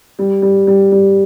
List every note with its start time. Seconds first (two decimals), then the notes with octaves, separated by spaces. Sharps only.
0.19 G3
0.42 G3
0.67 G3
0.92 G3